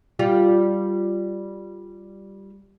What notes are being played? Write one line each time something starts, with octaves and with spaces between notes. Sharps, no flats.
G3 F4 G4